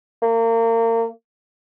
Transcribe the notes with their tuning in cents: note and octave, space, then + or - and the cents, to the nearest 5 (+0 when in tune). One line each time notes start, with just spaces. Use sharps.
A#3 -30